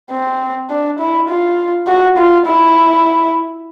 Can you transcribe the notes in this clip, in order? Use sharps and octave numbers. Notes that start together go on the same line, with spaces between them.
C4
D4
E4
F4
F#4
F4
E4